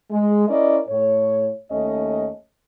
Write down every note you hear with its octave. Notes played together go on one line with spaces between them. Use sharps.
G#3
C#4 E4 A#4 D5 D#5
A2 C#5
D#2 A3 C#4 D#5